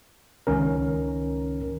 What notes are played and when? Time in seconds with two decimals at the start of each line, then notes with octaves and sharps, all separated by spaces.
0.47 C#2 D#3 C#4 A#4